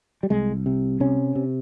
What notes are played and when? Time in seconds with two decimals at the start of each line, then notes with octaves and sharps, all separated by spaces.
0.23 G3
0.30 C2 G#3
0.66 C3
1.00 C3 C#4
1.35 C3